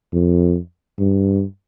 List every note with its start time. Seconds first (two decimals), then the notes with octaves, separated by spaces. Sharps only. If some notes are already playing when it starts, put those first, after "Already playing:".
0.13 F2
0.99 G2